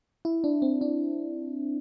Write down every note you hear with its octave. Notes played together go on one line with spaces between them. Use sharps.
E4
D4
C4
D4